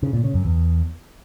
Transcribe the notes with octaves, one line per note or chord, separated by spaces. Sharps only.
C#3
A#2
C#3
F#2
E2